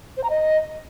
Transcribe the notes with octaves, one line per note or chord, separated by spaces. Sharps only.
C5
A#5
D#5